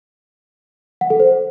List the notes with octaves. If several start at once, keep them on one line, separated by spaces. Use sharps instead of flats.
F#5
A4
C5